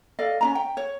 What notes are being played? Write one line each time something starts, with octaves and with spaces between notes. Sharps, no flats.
A4 D5 D#5 F5
C#4 D4 A#5
G5
C#5